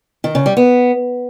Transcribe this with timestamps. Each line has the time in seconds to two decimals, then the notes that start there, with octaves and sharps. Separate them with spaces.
0.24 D#3
0.35 C#3
0.46 G3
0.57 B3